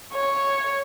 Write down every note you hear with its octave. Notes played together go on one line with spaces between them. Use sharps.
C#5